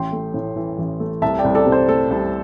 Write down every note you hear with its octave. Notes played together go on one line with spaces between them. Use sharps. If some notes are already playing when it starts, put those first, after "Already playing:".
Already playing: A1 G5 C6
A3
A2
E3
A1
A3
C2 E5 A5
D5 G5
C2
A4 D5
C3
C5
A3 A4
C2